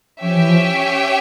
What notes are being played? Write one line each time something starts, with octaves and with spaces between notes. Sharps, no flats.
F3 C#4 G4 C#5 E5 G5
E3
F3